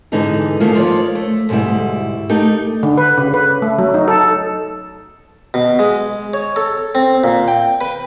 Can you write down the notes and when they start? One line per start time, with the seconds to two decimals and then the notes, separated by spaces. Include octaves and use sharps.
0.12 G#2 D3 E3 B3 D#4 G#4
0.60 G#2 D#3 A3 A#3 E4 F4
0.75 F3 F4 A#4 C#5 D5
1.15 A3
1.49 D2 G#2 B2 G3 E4
2.29 A3 D#4 G4 A#4
2.83 D3
2.97 B4
3.18 C#3
3.34 B4
3.62 A3
3.79 F#3
3.94 D#4
4.08 A4
5.54 B2
5.79 G#3
6.34 C#5
6.56 A4
6.95 C4
7.24 A#2
7.48 G5
7.81 B4